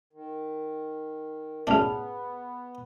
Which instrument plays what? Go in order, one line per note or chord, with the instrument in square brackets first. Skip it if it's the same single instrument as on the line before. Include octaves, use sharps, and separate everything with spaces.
[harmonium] D#3
[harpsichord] A1 F#2 D4 [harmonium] B3 [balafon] G#4 A5